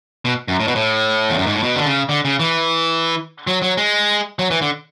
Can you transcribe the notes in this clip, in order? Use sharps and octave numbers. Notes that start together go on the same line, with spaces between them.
B2
F#2
A2
B2
A2
E2
F#2
G#2
A2
B2
D3
C#3
D3
C#3
E3
F#3
F#3
G#3
F#3
E3
D3